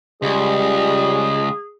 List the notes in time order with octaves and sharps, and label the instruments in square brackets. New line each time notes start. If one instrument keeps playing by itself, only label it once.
[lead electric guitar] C#2 [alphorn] G3 [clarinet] G#4